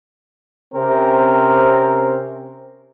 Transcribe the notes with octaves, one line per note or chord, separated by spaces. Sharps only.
C3 C4 C#4 A#4 C5